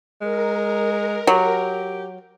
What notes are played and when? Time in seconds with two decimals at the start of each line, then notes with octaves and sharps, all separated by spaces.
0.21 G#3 A#4
1.27 F#3 G4